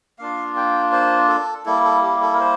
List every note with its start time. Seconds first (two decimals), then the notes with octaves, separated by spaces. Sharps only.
0.19 A#3 D4 F4 F5
0.56 G5
0.92 C5
1.29 A4
1.66 G3 A#3 E4 A4
1.84 A4
2.03 G4
2.21 A4
2.34 A#4
2.40 C5